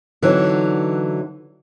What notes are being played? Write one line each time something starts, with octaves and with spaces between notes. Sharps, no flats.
D3 E3 F#3 C4 D#4